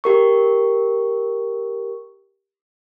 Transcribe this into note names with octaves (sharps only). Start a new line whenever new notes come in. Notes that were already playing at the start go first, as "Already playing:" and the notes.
G4 A#4 C#6